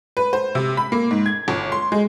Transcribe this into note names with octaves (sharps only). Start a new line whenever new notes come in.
B4
C5
C3
B5
A#3
G#2
G#6
G1
C6
G#3